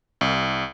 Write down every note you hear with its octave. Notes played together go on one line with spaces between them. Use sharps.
C2